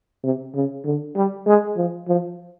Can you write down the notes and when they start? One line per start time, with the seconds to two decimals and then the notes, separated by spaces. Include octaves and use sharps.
0.23 C3
0.54 C#3
0.84 D3
1.15 G3
1.46 G#3
1.76 F3
2.08 F3